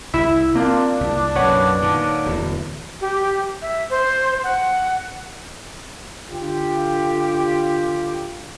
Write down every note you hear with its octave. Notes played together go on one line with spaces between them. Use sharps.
C2 E4 E5
A#3 C4 D4 F4
C2
B1 F#2 A#2 B4 C#5 F#5
A#2 D#3
D1 E2
G4
E5
C5
F#5
D3 F4 G4